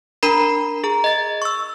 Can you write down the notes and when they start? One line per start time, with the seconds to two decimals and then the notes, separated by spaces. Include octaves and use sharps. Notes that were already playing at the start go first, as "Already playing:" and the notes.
0.23 D4 A#4 A#5 B5 C7
0.84 G#4 A#5
1.04 D#5 A6
1.42 C#6 E6